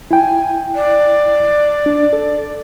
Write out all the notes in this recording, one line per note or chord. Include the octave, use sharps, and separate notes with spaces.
E4 G5 G#5
D5
D4
A4